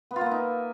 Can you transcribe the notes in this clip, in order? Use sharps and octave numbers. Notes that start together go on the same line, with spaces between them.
B3
F4
A#3
E5
D#4